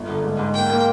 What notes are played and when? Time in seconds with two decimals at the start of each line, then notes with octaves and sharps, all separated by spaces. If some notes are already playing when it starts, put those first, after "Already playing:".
Already playing: G1
0.08 D3
0.24 G#2
0.39 G#2
0.54 A#3 G5
0.70 A#3